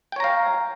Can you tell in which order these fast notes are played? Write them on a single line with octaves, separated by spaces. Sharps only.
G5 C#5 A#5 F5